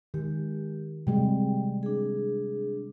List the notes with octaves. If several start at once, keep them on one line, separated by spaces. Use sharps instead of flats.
D#3 G#3 G4
C3 G3 G#3 G5
D4 G#4